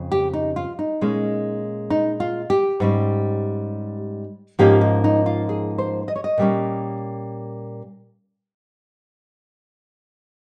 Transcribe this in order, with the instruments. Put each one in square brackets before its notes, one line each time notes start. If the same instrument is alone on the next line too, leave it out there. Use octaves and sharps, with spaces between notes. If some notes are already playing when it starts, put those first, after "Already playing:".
Already playing: [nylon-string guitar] F2 C#3
G4
D#4
F4
D#4
A#2 G#3 C#4
D#4
F4
G4
G#2 G3 C#4
G#2 F3 A#3 C#4 G4
D#4
D#4
F4
G#4
C5
D#5
C#5
D#5
A#2 G3 A#3 C#4